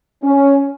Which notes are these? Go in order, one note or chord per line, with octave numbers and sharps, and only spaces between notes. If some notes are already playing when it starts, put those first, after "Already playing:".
C#4